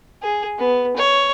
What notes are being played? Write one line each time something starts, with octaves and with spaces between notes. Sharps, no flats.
G#4
B3
C#5